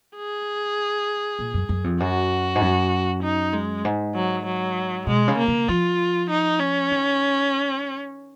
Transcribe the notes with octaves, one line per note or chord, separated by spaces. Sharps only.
G#4
A#2
F#2
F#2
F2
F#2 F#4
G#2
F#2
D#4
G#3
G#2
F#3
F#3
B2 G#3
C#3
A#3
C#3
F3 F4
D#4
C#4
D#3